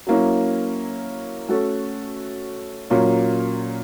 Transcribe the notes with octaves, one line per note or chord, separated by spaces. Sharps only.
F#3 A#3 C#4 E4
A3 C#4 F#4 A4
A#2 F#3 A#3 C#4